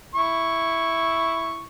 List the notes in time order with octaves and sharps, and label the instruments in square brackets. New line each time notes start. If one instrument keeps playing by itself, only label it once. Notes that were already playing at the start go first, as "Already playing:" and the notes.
[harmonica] E4 C#6